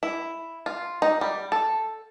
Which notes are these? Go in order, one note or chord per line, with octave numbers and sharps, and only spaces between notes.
E4
F4
D#4
G3
A4